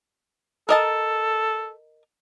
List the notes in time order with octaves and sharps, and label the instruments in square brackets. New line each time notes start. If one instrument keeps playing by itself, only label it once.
[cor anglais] A4 [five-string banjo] A#4 D#5 A5